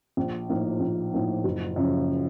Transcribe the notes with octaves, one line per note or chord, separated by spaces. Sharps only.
A#1
A2 F3 A#3 D#4
A#1
A2 F3 A#3 D#4
F#1
F#2 C#3 F3